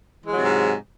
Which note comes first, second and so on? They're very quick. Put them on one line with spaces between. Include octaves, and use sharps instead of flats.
E3 G#3 F#3 C3 G#2